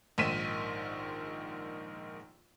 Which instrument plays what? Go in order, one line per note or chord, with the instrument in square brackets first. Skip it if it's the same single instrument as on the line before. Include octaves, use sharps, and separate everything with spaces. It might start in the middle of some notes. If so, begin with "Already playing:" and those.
[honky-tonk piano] A#1 G#2 D#3 B6 D#7 E7